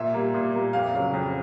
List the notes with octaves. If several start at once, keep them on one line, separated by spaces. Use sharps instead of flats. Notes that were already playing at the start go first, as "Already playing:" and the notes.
Already playing: A#2 E5
G3 A#3
A#2
G3 A#3
F2 F5
C#3 F#3
F2